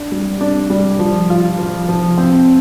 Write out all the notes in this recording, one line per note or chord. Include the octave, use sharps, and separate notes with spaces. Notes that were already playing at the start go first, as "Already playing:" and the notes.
Already playing: D4
G3
D4
G3
F3
F4
F3
F3
C4